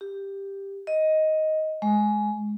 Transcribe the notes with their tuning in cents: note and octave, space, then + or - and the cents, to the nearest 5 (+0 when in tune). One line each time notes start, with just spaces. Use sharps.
G4 +5
D#5 +5
G#3 +15